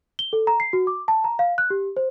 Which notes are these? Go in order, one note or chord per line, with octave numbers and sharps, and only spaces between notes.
G7
A4
A#5
C7
F#4
D6
A5
A#5
F5
F#6
G4
C5